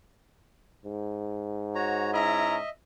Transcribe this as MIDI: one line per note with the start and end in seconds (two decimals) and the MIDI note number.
0.85 2.61 44
1.75 2.11 66
1.75 2.11 73
1.75 2.11 82
2.13 2.57 61
2.13 2.57 64
2.13 2.69 75
2.13 2.69 76
2.13 2.57 82